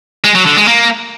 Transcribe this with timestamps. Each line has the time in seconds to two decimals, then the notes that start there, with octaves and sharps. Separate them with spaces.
0.24 G#3
0.35 F#3
0.46 D3
0.57 G#3
0.68 A#3